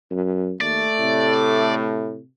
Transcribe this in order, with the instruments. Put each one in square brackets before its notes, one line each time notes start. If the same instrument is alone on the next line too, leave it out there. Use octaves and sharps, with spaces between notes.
[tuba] F#2
[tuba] D#2 [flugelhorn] A3 [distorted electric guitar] D5
[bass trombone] A2 [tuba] C3